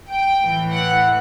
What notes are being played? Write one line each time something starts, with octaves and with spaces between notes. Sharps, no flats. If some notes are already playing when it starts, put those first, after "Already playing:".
G5
A2 E3
F#5